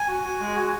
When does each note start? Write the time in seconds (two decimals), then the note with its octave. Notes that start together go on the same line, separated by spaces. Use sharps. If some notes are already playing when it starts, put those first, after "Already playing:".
Already playing: G#5
0.08 F#4
0.25 F#4
0.40 G#3
0.56 F#4